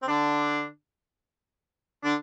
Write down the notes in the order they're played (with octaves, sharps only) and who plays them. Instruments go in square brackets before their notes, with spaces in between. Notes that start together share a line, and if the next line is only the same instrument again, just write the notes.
[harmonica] C4
D3 D4
D3 D4